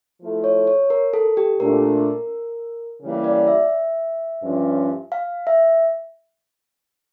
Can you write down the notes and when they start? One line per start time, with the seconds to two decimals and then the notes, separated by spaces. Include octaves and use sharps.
0.20 F3 A3 E4 A4
0.44 C#5
0.67 C#5
0.90 A#4
1.13 A4
1.37 G4
1.60 A#2 A3 D4 A#4
3.01 C#3 E3 G3 A#3
3.24 D5
3.47 E5
4.42 G2 F3 C#4
5.12 F5
5.47 E5